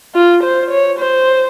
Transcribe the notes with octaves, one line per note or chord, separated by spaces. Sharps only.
F4
C5
C#5
C5